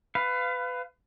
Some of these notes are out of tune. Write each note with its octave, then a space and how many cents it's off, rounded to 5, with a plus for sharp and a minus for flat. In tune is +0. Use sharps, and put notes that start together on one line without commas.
B4 +25 F5 +0